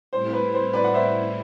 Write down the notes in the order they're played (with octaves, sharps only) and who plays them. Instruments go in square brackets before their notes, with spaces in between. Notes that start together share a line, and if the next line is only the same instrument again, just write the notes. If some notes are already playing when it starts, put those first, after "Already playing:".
[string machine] A2 G3 C4 E4 [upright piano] C5
[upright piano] B4
C5
B4 D5
F#5
C5 E5